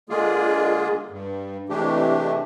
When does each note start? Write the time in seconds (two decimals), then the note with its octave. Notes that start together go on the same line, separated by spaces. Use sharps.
0.09 D3 G#3 A#3 F4 G#4
1.11 G2
1.69 C3 E3 G#3 A3 D4 G4